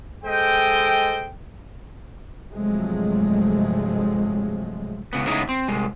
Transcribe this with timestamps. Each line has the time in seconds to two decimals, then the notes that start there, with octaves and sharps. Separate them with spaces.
0.24 G#3 A4 C5 D#5 G5
2.53 G2 C3 F3 F#3 G#3 A3
5.13 C#2 G2 C#3 B3
5.27 A2 C#3 G#3 B3 D#4 E4
5.49 C4
5.68 C2 G#3